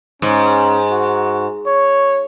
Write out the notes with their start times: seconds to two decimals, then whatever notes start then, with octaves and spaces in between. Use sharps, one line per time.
0.22 G#2 C#4
0.90 F#4
1.67 C#5